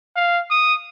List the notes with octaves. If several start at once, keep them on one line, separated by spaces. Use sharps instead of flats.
F5
D#6